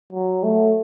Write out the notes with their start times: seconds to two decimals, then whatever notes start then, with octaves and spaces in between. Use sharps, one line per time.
0.13 F#3
0.44 A3